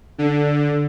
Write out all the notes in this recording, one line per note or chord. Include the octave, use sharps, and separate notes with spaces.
D3